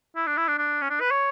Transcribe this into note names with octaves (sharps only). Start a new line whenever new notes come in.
E4
D4
E4
D4
D4
C#4
D4
B4
C#5